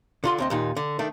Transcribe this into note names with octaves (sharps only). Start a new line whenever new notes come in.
D3 F4 C6
D2 C4 D#5
D#2 A#2 D#4
D3
D#3 A3 D4